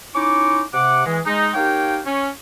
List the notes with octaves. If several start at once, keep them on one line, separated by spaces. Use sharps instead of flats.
C#4 D#4 E4 C#6 D6
C3 F#5 D6
E3 G#3
G#3 D#4
A#3 D#4 G4 C#5 F5 G5
C#4